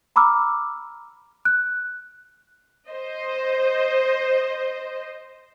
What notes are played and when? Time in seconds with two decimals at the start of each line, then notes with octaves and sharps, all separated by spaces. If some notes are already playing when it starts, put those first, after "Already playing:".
0.16 A#5 B5 D6 E6 F6
1.45 F#6
2.89 C5 D#5